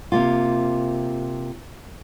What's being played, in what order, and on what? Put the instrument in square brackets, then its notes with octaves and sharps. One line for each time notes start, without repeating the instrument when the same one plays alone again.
[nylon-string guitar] C3 A#3 F4